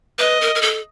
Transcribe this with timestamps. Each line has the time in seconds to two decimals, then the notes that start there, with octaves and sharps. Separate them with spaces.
0.19 B4 D#5
0.41 A#4
0.55 A#4
0.62 A4